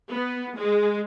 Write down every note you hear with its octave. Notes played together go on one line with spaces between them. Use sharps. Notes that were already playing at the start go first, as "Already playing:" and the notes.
B3
G#3